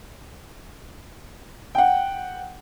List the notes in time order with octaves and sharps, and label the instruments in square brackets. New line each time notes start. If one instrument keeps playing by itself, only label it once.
[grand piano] F#5 G5